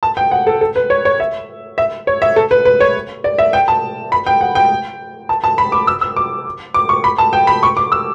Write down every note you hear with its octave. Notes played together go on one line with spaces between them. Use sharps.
A5
G5
F#5
A4
A4
B4
C#5
C#5
E5
E5
C#5
E5
A4
B4
B4
C#5
D5
E5
G5
A5
B5
G5
F#5
G5
A5
A5
B5
D6
E6
E6
D6
D6
C#6
B5
A5
G5
B5
C#6
D6
E6